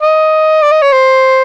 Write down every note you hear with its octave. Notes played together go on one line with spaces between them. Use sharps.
D#5
D5
D#5
C#5
C5